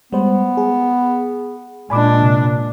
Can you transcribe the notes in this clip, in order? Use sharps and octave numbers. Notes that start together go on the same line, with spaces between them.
G3 G#3 B3 C5
G#4
A#2 G#3 D4 G#5 B5 D6
C3